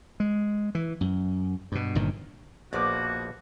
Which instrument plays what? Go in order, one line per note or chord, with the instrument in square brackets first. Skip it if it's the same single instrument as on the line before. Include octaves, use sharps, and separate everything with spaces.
[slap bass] G#3
E3
F#2
G2 B2
G1 G2 A#2 D#3
[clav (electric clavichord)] A#1 F3 [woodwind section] B2 A#3 F#4 [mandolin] D5 B5 D6